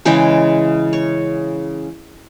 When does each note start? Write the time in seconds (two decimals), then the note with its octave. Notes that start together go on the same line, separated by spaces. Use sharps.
0.05 C#3 E3 G#3 G5
0.93 C#5